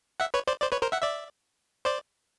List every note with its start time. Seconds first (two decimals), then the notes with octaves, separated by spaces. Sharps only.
0.20 E5 F#5
0.34 B4 C#5
0.47 C5 D5
0.62 C5 D5
0.72 B4 C#5
0.82 A#4 C5
0.92 E5 F#5
1.02 D5 E5
1.85 C5 D5